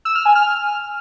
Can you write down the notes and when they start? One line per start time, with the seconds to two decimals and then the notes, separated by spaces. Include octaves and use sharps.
0.05 E6
0.15 F6
0.25 G#5
0.35 F6